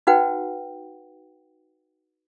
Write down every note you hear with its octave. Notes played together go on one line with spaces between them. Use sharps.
D#4 F#4 B4 C5 F#5 G5